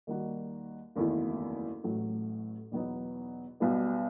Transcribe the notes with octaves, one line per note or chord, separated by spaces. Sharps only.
D#2 D#3 G3 D#4 F#4
F#1 E2 D#3 A3 E4
A1 A2 F#3 A3
E2 B2 F#3 B3 D#4
B1 B2 G3 B3